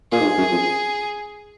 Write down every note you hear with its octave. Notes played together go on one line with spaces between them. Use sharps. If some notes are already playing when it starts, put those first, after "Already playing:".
A#2 G#4
G#2
G2
F#2
F2